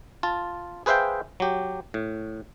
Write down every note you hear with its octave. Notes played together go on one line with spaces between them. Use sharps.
F4 A5
G#4 B4 C5 E5 F5 G5
F#3 G4
A2